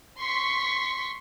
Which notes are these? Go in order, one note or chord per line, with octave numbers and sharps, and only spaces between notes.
C6 C#6 B6